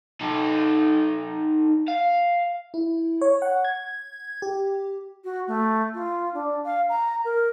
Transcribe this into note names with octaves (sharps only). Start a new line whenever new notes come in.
D#4 A4
F5
E4
C#5
F#5
G#6
G4
F#4
A3
F4
D4
F5
A#5
A#4